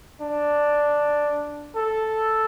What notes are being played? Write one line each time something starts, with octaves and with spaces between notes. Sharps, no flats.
D4
A4